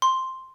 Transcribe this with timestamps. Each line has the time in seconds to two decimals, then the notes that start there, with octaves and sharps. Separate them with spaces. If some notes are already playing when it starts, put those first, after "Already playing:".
0.02 C6